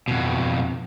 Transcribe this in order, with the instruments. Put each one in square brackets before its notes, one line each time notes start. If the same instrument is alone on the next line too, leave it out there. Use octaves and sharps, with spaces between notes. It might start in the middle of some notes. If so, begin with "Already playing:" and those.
[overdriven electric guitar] F2 B2